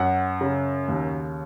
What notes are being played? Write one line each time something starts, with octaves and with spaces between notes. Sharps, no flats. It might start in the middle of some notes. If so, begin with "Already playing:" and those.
Already playing: F#2 F#5
C#3
D#2